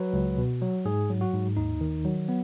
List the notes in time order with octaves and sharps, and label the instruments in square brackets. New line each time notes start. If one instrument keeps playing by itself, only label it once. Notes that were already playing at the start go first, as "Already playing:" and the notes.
Already playing: [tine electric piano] F#3 B4
C#2
B2
F#3
G#2 G#4
F#3
F#4
G#2
D#2 D#4
D#3
F#3
B3